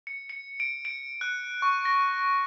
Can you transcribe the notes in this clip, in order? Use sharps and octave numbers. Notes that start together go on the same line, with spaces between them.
C#7
C#7
D7
D7
F#6
C#6
A#6